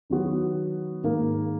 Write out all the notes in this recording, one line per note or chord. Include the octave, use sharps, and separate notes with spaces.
D#3 F#3 B3 F#4
G#2 D#3 A#3